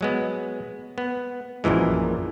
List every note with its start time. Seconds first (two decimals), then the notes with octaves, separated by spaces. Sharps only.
0.01 F#3 G#3 B3
0.98 B3
1.64 A#1 F#2 A#2 E3 G#3